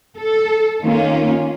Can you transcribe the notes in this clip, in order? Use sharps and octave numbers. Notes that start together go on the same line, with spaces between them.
A4
D#3 A#3 C#4 F4